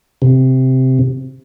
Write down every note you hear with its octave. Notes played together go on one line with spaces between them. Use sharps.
C3